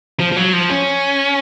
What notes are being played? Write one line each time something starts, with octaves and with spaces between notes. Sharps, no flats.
F3
F3
F#3
F3
C#4